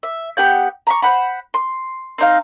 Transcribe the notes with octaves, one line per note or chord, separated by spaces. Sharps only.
E5
B3 G4 F#5 G6
A#5 B5 C#6
C5 F#5 B5
C6
C4 D#4 F5